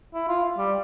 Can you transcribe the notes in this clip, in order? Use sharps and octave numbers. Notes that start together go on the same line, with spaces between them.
E4
F4
G3